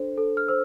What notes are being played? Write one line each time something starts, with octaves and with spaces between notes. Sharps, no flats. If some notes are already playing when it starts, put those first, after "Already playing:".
Already playing: D4 A4 C5
A4
F6
C5 E6